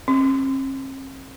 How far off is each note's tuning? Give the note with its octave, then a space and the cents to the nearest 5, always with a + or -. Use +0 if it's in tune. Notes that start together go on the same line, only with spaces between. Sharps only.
C4 +45